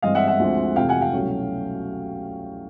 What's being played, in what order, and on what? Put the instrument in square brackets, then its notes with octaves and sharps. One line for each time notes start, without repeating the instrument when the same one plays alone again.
[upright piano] G2 E3 G#3 C4 D#5 F5
E5 F#5
E5 F#5
D2 D3 F3 G#3 C4
F2 C3 E3 A3 F5 G5
F#5 G#5
F5 G5
C2 B2 F#3 A3 C#4